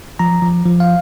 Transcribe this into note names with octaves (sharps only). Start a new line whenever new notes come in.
F3 A#5
F3
F3
F5